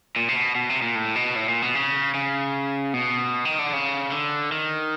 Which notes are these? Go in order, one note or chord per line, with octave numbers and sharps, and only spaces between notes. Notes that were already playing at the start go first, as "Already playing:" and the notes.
A#2
C3
B2
B2
C3
A#2
A2
B2
A2
A#2
B2
C#3
C#3
B2
D#3
D3
C#3
D3
D#3